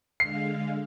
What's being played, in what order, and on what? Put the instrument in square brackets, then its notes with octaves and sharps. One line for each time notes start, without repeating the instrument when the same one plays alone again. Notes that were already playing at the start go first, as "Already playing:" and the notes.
[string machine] D3 G#3 F5 [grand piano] C7